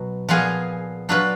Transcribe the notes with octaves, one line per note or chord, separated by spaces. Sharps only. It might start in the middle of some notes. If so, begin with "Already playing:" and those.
Already playing: B2 F#3
A#2 F3 B3 F4 G#4
F#3 D4 F4 B4